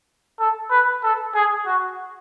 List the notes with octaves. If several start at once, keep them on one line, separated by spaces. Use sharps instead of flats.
A4
B4
A4
G#4
F#4